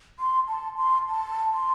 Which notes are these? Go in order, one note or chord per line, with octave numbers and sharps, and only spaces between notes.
C6
A5
C6
A5
C6